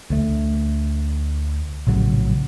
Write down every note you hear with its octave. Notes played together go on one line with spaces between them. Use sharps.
D2 A3
A#1 A2 C#3 F#3